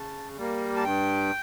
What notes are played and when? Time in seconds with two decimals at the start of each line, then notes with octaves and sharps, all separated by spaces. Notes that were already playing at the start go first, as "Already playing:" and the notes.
Already playing: C#3 A5
0.37 G3 A#3
0.77 A5
0.84 G2 G5